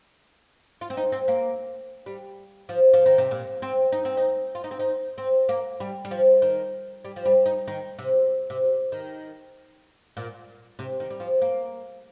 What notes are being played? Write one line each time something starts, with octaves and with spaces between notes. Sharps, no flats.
F4
C4
D#4
C4
A#3
G3
F3
F3
D#3
C3
A#2
C4
D#4
C4
D#4
F4
D#4
C4
D#4
C4
A#3
G3
G3
F3
D#3
G3
F3
G3
D#4
D#3
C3
C3
D#3
A#2
C3
D#3
G3
F3
A#3